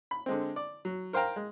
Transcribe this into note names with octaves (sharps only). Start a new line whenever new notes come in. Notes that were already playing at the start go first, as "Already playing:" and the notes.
B5
D3 G#3 C4
D5
F#3
A#4 C5 F5 G5 A#5
G#3